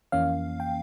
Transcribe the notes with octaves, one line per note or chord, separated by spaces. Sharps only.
F2 E3 A#3 C#4 F5
G5